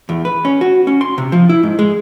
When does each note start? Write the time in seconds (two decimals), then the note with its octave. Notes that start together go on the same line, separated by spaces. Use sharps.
0.09 E2
0.25 B4
0.45 C#4
0.61 F#4
0.87 C#4
1.01 C6
1.18 C3
1.32 F3
1.49 E4
1.63 G#2
1.79 G#3